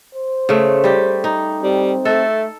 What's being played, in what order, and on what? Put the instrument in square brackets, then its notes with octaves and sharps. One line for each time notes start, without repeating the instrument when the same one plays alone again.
[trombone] C5
[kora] C#3 A3
G3 G4
D#4
[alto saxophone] G3 [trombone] C4
[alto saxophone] A3 [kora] A4